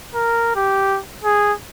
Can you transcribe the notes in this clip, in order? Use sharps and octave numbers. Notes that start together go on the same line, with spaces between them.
A#4
G4
G#4